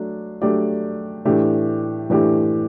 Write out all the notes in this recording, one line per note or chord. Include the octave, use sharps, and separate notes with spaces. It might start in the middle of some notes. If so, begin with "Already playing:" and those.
Already playing: F#3 A3 D4
F#3 A3 D4 G4 D5
A2 E3 A3 D4 G4
A2 E3 A3 D4 G4